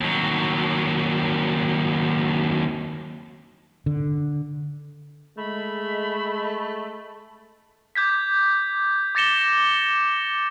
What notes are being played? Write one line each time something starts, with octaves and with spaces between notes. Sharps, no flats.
D#2 F#3
D3
G#3 A3 B5
D6 G6 G#6 B6
D6 A6 A#6 C#7 E7 G7